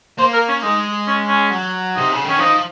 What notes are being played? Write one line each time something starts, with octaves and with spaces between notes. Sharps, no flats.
A#3 C5
A#4
C#4
G#3 D#4
C#4
C#4
F#3
C3 D#4
C#3
D#3 C#4
F3 D#4